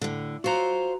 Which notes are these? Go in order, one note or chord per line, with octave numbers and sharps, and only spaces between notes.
A2 D3
F4 F#4 C5 A#5